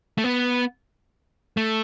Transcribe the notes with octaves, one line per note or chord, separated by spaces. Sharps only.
A3
B3
A3